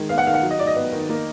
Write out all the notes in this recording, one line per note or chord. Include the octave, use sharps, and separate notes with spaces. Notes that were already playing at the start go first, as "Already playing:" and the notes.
Already playing: D#3 G#3
B3 F5
F#5
D#3 F5
F#5
F#3
D#5
D#4 D5
D#5
B3
D#3
A#3